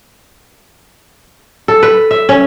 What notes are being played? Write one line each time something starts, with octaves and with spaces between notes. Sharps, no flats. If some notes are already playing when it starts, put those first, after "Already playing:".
A4
B4
E5
C#4